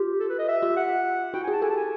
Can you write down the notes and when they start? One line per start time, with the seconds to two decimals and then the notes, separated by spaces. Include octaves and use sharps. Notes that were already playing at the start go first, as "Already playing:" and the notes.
Already playing: F4 G4
0.20 A4
0.30 B4
0.39 D#5
0.48 E5
0.62 F4 G4
0.77 F#5
1.34 E4 F#4 G5
1.44 G#5
1.47 F#4 G#4 A5
1.62 G4 A4 G#5
1.69 A5
1.77 G#5